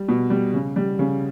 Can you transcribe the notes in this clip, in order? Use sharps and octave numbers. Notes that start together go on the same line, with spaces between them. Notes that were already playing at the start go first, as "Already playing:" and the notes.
Already playing: G3
B2
G3
C#3
G3
C#3